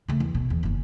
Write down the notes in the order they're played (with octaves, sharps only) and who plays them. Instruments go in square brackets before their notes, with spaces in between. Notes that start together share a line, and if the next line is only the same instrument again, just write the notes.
[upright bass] C#3 A3
E2
B2
E2
F#1 C#4